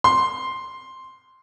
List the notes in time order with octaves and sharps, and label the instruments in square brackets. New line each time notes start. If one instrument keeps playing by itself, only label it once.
[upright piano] C6